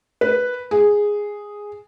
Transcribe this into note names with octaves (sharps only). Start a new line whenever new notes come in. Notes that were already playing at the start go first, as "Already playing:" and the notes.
B4
G#4